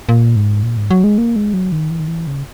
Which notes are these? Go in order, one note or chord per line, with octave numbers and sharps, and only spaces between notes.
A#2
G#2
A#2
G#2
F#3
G#3
A#3
G#3
F#3
D#3
E3
D#3
E3
C#3